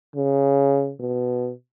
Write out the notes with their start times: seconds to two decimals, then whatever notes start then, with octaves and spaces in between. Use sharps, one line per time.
0.16 C#3
1.01 B2